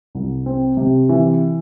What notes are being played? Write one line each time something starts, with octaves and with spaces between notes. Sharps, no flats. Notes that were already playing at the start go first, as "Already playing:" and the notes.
C2
C4
C3
E3